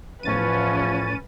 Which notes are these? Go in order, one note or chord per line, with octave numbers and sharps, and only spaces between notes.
E2 A2 F3 C#4 B4 A6 D#7